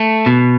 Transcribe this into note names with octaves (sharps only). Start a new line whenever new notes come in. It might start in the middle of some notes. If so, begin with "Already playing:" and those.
Already playing: A3
B2